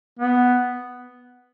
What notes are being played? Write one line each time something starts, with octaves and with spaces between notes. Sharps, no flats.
B3